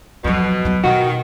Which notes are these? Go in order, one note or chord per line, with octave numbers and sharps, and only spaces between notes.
F2 B2 F#3
F#3 B3
B2 D#3 F#4